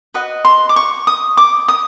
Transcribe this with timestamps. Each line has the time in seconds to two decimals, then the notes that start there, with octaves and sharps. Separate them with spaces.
0.14 F#4 B4 D#5
0.45 C6
0.69 D6
0.76 C#6
1.07 D#6
1.37 D6
1.68 D#6